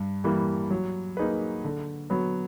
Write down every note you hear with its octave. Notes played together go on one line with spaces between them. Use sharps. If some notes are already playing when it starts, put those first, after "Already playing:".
Already playing: G2
E3 G3 A#3
F#3
A#3 D#4 G#4 B4
D3
F#3 B3